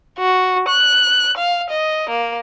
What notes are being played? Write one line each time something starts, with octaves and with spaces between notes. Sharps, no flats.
F#4
F#6
F5
D#5
A#3